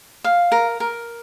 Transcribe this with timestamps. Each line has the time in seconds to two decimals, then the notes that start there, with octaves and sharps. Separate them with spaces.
0.24 F5
0.52 A#4
0.80 A#4